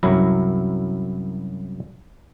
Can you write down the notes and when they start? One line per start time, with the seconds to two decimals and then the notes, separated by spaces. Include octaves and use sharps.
0.03 C2 F#2 F#3 E4 A#5